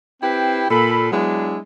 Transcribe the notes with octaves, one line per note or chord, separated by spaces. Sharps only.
C4 E4 G4 B4 G5
A#2 A4 B5
F#3 G#3 B3 D4 E4